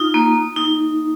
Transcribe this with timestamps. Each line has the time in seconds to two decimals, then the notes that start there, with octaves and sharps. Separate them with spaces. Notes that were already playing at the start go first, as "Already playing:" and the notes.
Already playing: D#4 F4
0.14 A#3
0.56 D#4